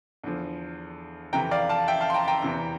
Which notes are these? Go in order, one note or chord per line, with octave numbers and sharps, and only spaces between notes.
E2 D3 F3
F2 C3 E3 G5 A#5
D5 F5
F5 A5
E5 G5
F5 A5
C6
G5 A#5
G5 A#5
E2 C3 E3